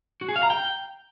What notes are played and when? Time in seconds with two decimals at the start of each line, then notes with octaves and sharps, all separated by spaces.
0.21 F#4
0.29 G#4
0.36 F5
0.43 A#5
0.50 G5